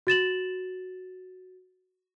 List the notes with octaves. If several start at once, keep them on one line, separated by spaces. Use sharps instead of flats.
F#4 A6 E7 F#7